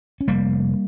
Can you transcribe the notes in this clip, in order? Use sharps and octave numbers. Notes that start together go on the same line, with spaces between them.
C#4
F1 G3 A#3